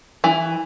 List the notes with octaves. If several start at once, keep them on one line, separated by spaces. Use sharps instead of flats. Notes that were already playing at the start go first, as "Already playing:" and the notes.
E3